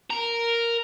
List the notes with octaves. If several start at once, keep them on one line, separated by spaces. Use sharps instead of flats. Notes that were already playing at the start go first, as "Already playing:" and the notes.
A#4